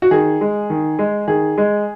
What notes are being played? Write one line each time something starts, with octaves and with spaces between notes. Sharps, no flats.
F#4
D#3 G#4
G#3
D#3
G#3
D#3 G#4
G#3